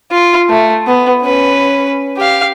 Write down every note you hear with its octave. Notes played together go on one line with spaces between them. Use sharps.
F4
A3
B3
C#4 B4
G4 F5